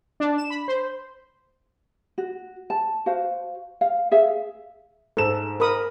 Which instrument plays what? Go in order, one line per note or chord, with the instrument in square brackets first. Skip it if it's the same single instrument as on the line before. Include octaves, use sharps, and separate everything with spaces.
[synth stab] D4
E7
B5
C5
[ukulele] F#4
A5
F#4 C5 F5
F5
G#4 E5 F5
[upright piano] G#2 E7 [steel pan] A4
[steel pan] A#4 B5 D#6